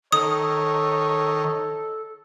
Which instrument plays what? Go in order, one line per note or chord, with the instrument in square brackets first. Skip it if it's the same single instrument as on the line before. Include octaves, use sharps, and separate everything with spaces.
[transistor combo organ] D#3 [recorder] A4 [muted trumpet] C#5 [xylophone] D#6